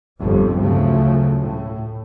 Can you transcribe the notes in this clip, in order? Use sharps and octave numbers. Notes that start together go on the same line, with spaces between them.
G1 F2 G3
D2 C#3 F3 F#3 A3
A2